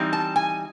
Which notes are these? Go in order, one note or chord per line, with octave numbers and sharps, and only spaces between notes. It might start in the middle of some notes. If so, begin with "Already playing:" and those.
Already playing: E3 G3 C4 D#4
A5
G#5